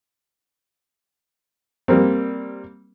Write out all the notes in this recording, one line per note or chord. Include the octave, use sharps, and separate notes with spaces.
G3 A#3 C4